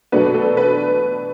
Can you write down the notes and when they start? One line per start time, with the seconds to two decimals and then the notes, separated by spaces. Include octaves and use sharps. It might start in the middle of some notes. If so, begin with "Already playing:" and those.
0.12 B2 F#3 A3 D4 B4
0.34 A4
0.57 B4